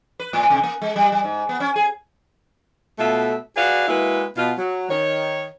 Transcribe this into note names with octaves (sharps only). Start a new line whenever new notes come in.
B4
A2
C3
A#3
G#3
G3
G3
G#2
B3
C#4
G#4
B2 A3 F4 A4 E5
F#4 G#4 B4 D5 F5
G#3 A#3 E4 F#4 B4
B2 F4
F#3
D#3 C#5